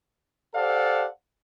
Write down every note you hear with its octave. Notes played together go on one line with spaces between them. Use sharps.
G4 A4 C5 D5 F5 F#5